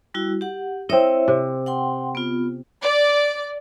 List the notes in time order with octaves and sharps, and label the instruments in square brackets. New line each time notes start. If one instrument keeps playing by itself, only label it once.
[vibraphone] G3 E4 F#4
G4 F#5
[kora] C4 D#5 [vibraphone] E4 C#5 E5
[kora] C3
[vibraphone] F#5 G5 C6
B3 F4
[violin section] D5